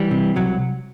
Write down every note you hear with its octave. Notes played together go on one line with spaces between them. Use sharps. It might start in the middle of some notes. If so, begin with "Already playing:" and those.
Already playing: E3 G3
C3
C2 F#3